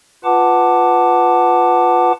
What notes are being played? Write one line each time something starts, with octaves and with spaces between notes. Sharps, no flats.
F4 B4 F#5 A5 D6